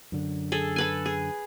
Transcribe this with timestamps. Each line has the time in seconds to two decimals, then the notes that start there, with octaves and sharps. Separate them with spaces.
0.12 F#2 D3
0.52 G#4 A4
0.76 A4 B4 G#5
1.06 G#4